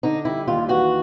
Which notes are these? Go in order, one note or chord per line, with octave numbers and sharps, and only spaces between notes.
D3 D#4
G3 E4
D#2 F4
E3 F#4